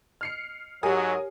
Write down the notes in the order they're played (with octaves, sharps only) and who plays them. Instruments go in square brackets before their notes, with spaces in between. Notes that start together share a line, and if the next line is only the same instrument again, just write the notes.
[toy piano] D#5 [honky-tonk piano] F6 C7 C#7
[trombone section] G#2 F#3 [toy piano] G4 F#5 [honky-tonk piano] A#4 G#5 D#6 [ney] C#5